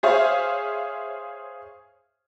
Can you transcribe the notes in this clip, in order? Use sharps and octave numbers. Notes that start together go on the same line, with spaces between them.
G#4 C5 C#5 E5 F5